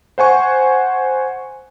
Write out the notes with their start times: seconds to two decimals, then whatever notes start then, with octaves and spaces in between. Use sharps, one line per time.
0.18 C5 F#5 G#5 C#6